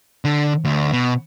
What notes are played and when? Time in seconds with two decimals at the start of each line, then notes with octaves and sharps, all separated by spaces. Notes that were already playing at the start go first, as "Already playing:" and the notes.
0.25 D3
0.65 D2
0.92 B2